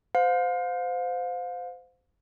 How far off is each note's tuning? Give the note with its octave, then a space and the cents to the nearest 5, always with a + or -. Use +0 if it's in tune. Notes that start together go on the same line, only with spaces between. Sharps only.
C5 -25 F5 +35